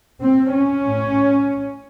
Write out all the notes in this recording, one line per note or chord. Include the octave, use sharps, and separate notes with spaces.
C4
C#4
A2